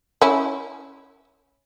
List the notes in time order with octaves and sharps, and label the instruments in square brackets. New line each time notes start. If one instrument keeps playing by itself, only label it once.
[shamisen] C#4 E4